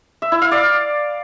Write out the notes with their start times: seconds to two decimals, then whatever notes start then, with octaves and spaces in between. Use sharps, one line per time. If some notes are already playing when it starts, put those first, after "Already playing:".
0.22 E5
0.32 E4
0.42 F5
0.51 D5